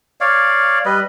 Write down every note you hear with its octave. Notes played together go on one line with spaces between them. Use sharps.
C#5 D5 F5
G3 B4 D#5